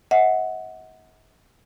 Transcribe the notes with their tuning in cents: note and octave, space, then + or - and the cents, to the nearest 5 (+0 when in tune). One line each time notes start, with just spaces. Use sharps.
D#5 +45 F#5 +0